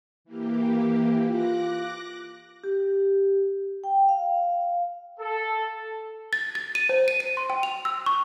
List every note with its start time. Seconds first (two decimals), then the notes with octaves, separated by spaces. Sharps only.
0.25 E3 A#3 G4
1.28 F4 D6 F#6 A#6
2.64 G4
3.84 G5
4.09 F5
5.20 A4
6.33 A6
6.55 A6
6.75 D#7
6.89 C5
7.08 D#7
7.20 D#7
7.37 C6
7.50 G5
7.63 F7
7.85 E6
8.06 C#6